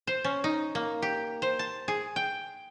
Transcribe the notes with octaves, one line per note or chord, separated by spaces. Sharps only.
C5
C#4
D#4
A#3
G4
C5
A5
G#4
G5